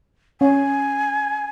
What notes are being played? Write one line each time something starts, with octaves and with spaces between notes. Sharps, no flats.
C#4 G#5